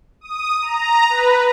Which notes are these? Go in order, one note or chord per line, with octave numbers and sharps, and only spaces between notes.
D#6
A#5
B4